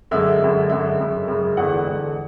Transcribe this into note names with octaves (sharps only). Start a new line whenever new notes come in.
F#2 D3 G#3 E5
F#2 D3 G#3
F#2 D3 G#3 E5
F#2 C#3 G#3
F#2 C#3 G#3
E2 D3 G#3 F#5
E2 D3 G#3